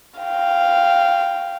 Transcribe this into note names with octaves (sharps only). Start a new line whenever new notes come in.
F5 G5